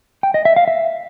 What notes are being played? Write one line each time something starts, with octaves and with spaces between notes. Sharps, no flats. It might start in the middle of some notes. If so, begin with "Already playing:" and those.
G5
D#5
E5
F5
E5